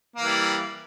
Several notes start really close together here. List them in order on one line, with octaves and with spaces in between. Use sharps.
A#3 E3 G3